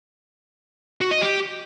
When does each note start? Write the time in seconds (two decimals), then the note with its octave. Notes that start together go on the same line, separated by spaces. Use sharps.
1.01 F#4
1.11 D#5
1.21 G4